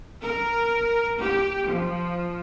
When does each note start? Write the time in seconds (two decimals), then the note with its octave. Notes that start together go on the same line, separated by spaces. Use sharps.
0.23 A#4
1.20 G4
1.68 F3